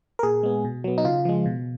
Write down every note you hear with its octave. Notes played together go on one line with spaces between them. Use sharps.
A#4
A#2 G#4
G#3 B3
B2
F#3 B3
D#4
C#3 F4
F3 G#3
B2